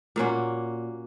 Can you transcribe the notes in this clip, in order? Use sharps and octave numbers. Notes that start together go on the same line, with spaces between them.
A#2 A#3 C#4 F#4